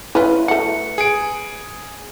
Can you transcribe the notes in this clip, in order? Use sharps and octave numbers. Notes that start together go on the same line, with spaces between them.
C#4 E4 F4 B4
A3 F#4 C#7
G#4 D7